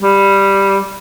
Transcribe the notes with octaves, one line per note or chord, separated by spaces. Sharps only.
G3